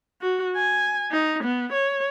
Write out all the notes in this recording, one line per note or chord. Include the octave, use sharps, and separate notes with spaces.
F#4
G#5
D#4
B3
C#5